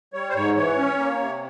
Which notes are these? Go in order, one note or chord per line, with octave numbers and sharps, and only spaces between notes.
G3 C#5
C5
G#2 C#5
E3 C#5
C#4
A#3
C3